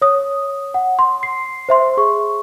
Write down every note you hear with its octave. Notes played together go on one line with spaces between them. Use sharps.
C#5 D#6
F#5
C6
C7
C5 E5 C6
G#4 C#6